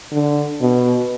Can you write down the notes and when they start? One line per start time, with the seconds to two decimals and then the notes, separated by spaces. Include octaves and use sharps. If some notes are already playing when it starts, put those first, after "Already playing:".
0.12 D3
0.61 B2